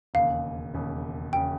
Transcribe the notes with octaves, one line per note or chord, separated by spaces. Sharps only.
E1 D#2 C#3 F5
E1 D#2 C#3
E1 C#3 G5